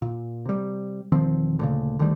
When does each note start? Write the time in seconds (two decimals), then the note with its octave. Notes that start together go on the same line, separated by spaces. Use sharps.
0.02 A#2
0.46 C3 G3
1.12 E1 D#3 F3 C4
1.59 D2 A#2 C#3
1.99 D2 D#3 G3